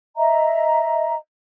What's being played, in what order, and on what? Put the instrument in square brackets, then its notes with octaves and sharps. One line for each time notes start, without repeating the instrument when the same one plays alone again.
[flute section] D#5 E5 A#5